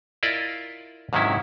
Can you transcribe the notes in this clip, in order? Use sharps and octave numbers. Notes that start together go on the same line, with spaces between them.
E4 F4 A#4 D5 D#5
G#2 C3 D#3 F#3 C#4 E4